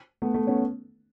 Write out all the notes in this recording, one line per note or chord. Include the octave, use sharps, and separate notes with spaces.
A3 B3
A3 B3
B3 C#4